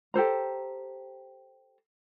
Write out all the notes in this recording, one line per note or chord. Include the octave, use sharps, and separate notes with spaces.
G4 A4 C5 A#5